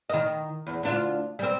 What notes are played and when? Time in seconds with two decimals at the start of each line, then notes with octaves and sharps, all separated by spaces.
0.10 D#3 D#5
0.67 E2
0.83 D2 D4 F4
1.39 G3 C4